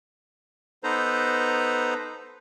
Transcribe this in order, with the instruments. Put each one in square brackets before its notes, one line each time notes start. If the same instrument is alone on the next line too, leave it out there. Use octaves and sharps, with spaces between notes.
[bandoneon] B3 D#4 A4 B4 C5 A#5